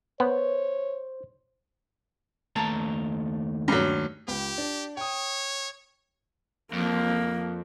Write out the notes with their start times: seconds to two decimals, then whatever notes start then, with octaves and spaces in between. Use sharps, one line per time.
0.20 B3 C5 C#5
2.56 D#2 A3 A5 A#5
3.68 G2 F#3
4.28 C#2 G4
4.58 D4
4.97 C#5 G5 D#6
6.73 F2 A#3